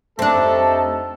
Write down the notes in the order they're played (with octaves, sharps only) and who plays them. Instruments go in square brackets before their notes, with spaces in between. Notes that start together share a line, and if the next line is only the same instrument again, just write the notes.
[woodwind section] F2 A5 [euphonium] A3 [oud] C4 D4 [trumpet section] D#4 G4 A4